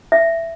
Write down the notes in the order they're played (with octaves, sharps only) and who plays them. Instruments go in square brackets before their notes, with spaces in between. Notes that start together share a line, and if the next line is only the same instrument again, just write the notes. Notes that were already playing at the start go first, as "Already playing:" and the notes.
[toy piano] E5